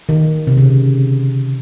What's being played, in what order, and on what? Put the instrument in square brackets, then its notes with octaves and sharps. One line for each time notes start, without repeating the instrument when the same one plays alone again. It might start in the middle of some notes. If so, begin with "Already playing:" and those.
[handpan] D#3
C3
C#3